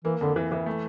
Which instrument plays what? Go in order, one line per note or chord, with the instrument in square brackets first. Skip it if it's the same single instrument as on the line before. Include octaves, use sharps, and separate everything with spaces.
[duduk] E3 [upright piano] A#3
[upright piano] F2 [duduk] D3
[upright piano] E3
E3
A3